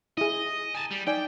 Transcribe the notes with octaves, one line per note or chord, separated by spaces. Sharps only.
E4 G#4 D#5
G#5 A5
G3
D#4 D5 G5 G#5